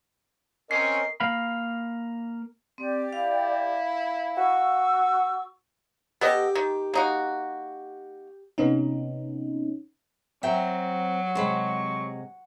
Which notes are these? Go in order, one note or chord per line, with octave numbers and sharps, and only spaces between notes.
C4 C#4 A#4 D#5 C7
A#3 F5 B5
C4 G4 D5
E4 F5
F#4 C#6 E6
B3 G4 A4 D#5
D#3
A#3 D#4 F#4
C3 B3 C#4 D#4
F#3 C4 E5 G5 A#5
C3 G#3 C5 B5 C#6